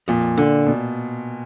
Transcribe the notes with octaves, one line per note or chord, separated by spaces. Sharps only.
F2 A#2
D3
B2